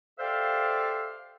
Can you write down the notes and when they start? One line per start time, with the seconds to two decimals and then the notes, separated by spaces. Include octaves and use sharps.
0.20 G4 A4 C5 D5 E5 F5